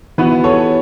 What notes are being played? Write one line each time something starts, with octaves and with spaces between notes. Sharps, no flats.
E3 B3 F#4 B4
A4 C#5